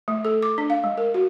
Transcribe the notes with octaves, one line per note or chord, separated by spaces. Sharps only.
A3
A4
D6
D4
F5
G#3
A#4
F#4